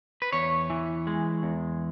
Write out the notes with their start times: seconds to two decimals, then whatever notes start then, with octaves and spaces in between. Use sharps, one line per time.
0.22 B4
0.32 E2 C#5
0.70 E3
1.07 G#3
1.43 E2